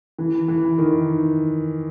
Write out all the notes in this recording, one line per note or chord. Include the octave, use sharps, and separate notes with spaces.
E3
E3
D#3